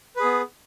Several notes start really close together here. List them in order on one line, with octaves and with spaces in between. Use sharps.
B4 G#4 B3